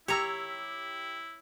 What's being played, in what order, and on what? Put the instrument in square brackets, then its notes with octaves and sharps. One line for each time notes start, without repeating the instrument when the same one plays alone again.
[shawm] E4 [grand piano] G4 E6 [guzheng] C#5 A#5